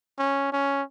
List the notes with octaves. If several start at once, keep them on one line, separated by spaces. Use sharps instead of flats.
C#4
C#4